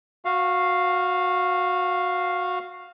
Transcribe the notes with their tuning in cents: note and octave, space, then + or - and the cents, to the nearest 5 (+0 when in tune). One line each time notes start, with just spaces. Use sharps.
F#4 -20 F5 +0